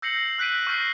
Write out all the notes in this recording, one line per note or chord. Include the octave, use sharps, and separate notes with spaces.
E6 G6 A#6 C7 C#7 F#7
E6 F#6 G6 B6 D7 D#7
C#6 F6 G6 A#6 C7